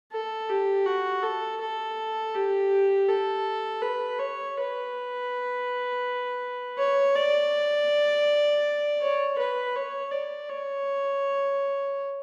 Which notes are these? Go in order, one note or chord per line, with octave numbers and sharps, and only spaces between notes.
A4
G4
F#4
A4
A4
G4
A4
B4
C#5
B4
C#5
D5
C#5
B4
C#5
D5
C#5